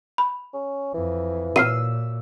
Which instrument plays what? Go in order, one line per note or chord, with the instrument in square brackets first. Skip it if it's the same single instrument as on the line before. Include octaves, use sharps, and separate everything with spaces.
[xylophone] B5
[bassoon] C#4
[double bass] F2 [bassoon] E3
[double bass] A#2 [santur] E6 [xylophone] F6 C7 D#7